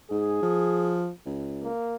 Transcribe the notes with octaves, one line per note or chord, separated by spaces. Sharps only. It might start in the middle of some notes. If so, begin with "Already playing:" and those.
G#2 G#4
F3
C#2
A#3